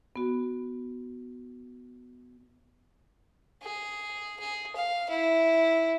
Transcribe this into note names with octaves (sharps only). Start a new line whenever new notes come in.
B3 F#4
G#4
G#4
F5
E4